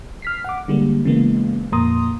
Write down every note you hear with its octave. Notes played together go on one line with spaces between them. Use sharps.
F6 B6 C7
F#5 D6
D3 G3 G#3 A#3
C#3 E3 G#3 A#3 B3
F2 A#2 A#3 A#5 C6 D#6